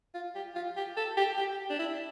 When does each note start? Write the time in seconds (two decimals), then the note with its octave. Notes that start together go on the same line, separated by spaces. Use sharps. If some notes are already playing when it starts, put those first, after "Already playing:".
0.15 F4
0.35 G4
0.55 F4
0.77 G4
0.97 A4
1.17 G4
1.37 G4
1.70 D4
1.79 E4